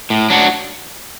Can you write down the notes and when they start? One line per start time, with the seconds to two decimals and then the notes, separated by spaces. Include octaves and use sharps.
0.10 A2
0.30 F#3 D4 F#4